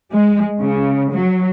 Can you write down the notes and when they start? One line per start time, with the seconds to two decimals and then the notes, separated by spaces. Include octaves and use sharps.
0.12 G#3
0.59 C#3
1.12 F#3